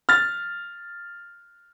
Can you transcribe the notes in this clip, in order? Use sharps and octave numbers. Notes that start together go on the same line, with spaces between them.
F6 A6